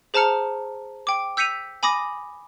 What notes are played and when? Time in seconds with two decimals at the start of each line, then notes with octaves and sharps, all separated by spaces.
0.14 G#4 C5 A5 A#5 F6 C#7
1.07 G5 D6
1.37 E6 G6 B6 C#7 D#7 F7
1.83 G#5 B5 D6 D#6 A#6